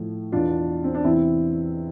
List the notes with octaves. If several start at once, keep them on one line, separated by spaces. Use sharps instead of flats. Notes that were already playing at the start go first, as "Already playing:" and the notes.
Already playing: A2 F3
E2 B2 D4 F4
C4
D4
E2 C3 E3 C4 E4